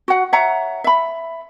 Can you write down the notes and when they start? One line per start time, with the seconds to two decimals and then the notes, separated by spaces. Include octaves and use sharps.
0.08 F#4 F#5
0.33 C#5 E5 F#5 A#5
0.84 E5 B5